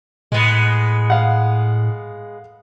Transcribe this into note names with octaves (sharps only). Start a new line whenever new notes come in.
A2 G#3 B3
F5 F#5